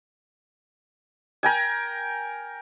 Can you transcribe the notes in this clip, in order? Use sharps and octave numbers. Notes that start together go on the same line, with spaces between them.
A#4 G5 G#5